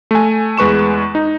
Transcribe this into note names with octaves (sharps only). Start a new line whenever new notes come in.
A3 G#5
E2 G#3 B4 C#6 E7
D#4